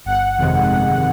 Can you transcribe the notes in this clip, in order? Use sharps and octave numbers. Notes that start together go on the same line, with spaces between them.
G1 F#5
F2 C3 D#3 G#3
G1